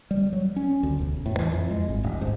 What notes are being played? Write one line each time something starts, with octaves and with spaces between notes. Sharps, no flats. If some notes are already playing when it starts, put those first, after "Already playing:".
G3
F#3
C#4
D2
E1
A2
E3
F2
G#3
G#1
D#1
G#2